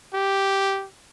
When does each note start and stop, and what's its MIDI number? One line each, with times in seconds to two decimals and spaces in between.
0.14 0.86 67